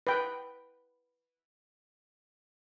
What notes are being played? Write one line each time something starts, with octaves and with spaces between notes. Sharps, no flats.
B4 G5